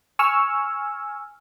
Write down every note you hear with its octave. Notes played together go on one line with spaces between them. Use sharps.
G#5 C#6 E6 F6